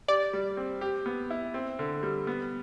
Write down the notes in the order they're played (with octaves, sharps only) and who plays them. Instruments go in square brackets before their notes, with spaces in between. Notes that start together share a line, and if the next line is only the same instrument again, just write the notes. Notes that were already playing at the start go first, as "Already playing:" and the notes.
[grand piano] G4 [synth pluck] D5
[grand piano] G3
C4
G4
B3
E4
C4
D3
G3
B3